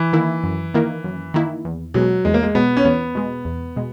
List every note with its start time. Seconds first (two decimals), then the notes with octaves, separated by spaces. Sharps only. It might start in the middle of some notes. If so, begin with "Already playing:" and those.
Already playing: E3
0.13 D#3 A#3 E4
0.44 F#2
0.74 D#3 A#3 E4
1.04 F#2
1.34 D#3 A#3 E4
1.65 E2
1.94 B2 F#3 G#3
2.25 E2 G#3
2.34 A#3
2.43 G#3
2.55 B2 G#3 B3
2.77 C#4
2.85 E2 B3
3.15 B2 G#3
3.45 E2
3.76 B2 G#3